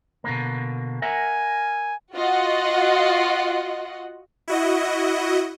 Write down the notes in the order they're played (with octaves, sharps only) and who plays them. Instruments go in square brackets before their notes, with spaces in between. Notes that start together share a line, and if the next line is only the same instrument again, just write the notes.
[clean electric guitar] B2 D3 A#3
[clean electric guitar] A#4 E5 F#5 [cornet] G#5
[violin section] F4 F#4 D#5 F#5
[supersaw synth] E4 F#4 D#5